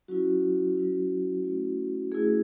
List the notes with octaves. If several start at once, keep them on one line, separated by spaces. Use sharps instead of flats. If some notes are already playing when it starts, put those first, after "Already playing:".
F#3 C#4 E4 F#4
F#3 C#4 E4
A3 C#4 E4
A3 C#4 E4 G#4